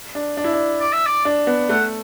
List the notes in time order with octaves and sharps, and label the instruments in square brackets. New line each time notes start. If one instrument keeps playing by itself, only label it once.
[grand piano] D4
D4
E4
D4
[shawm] D5
E5
D5
[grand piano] D4
B3
[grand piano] A3 [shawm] F#5